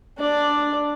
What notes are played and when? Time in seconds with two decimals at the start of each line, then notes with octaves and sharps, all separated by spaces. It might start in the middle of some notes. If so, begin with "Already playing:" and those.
0.19 D4 D5